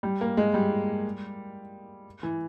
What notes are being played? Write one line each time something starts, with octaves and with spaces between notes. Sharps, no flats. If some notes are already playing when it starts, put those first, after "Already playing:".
G3
A#3
G#3
G3
E3